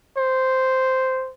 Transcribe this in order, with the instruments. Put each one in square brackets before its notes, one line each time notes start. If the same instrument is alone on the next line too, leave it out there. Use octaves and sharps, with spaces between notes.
[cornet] C5